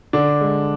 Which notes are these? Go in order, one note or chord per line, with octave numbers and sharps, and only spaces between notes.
D3 D4
G#3